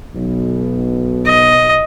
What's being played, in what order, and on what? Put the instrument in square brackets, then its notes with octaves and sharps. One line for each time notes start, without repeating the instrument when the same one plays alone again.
[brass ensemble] B1 B2
[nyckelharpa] D#5